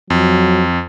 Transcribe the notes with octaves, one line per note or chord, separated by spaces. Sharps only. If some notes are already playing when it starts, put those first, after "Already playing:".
F2 F#3